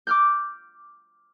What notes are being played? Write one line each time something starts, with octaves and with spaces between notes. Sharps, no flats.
D6 F6 G6